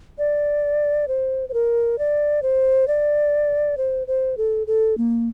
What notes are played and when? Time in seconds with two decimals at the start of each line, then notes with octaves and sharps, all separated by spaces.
0.18 D5
1.08 C5
1.49 C5
1.54 A#4
1.99 D5
2.43 C5
2.88 D5
3.77 C5
4.07 C5
4.37 A4
4.67 A4
4.98 A#3